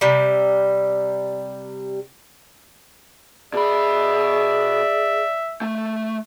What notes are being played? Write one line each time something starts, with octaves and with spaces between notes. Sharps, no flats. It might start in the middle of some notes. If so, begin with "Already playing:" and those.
C3 G3
B2 G#4 D5 E5 B5
A3